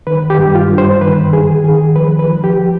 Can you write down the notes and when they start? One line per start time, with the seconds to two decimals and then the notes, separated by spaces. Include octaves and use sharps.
0.07 D#3 B4
0.30 G4
0.39 G2
0.55 F4
0.70 G2
0.78 C5
1.01 D#3 B4
1.33 D#3 G#4
1.64 D#3 G#4
1.96 F3 B4
2.19 B4
2.28 F3
2.44 G4
2.59 F3